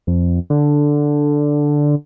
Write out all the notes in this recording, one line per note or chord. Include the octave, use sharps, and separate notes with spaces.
F2
D3